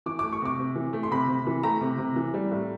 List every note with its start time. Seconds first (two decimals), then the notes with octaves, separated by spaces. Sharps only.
0.06 E3 D6
0.19 A3 D6
0.32 C#6
0.42 C3 D6
0.59 C3
0.75 E3
0.93 A3
1.03 C6
1.11 C3 B5
1.29 C3
1.47 E3
1.63 A3 A#5
1.81 C3
1.98 C3
2.16 E3
2.34 G3
2.51 A2